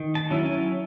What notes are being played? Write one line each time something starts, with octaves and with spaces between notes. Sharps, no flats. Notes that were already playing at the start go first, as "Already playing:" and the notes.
Already playing: D#3
A5
F#3 C#4 E4
G#5